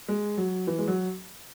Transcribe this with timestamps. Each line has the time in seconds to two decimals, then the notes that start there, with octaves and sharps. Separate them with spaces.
0.08 G#3
0.37 F#3
0.67 E3
0.78 G#3
0.88 F#3